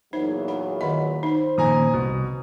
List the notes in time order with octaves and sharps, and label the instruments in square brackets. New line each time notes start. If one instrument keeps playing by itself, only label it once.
[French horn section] E2 A#2 F#3 [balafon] D#4 C5
[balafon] B5
[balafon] D#3 D#5 [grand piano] B5
[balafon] D#4 [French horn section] C5
[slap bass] A#2 D#3 F3 [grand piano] G#5 A#5 D#6
[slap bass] C2 [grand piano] B2